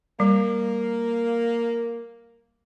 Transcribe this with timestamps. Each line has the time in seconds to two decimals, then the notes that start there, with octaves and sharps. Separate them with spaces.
0.20 G3 A#3